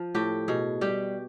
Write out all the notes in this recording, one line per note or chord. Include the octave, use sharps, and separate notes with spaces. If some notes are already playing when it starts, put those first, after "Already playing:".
Already playing: F3
A2 G4
B2 G#4
G3 G4